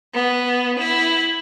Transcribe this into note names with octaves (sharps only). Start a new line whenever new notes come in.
B3
E4